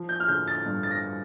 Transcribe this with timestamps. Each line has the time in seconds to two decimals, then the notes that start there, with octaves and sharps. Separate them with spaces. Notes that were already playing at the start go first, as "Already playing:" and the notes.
Already playing: F3
0.09 G6
0.20 F6
0.28 D3 G6
0.47 A6
0.66 G2
0.83 A6
0.91 A#6